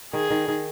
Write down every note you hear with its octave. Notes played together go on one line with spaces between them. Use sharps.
D#3 G#4
D#3
D#3